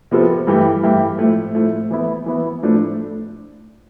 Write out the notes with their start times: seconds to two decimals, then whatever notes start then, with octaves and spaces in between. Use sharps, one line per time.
0.11 C3 F3 B3 F4 A4
0.47 G2 E3 A3 E4 G4
0.83 G2 E3 A3 E4 G4
1.19 A2 F3 A3
1.55 A2 F3 A3
1.91 E3 B3 E4
2.26 E3 B3 E4
2.63 A2 F3 A3 D4